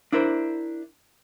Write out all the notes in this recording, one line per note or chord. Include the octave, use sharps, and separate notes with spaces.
D4 E4 A#4 C5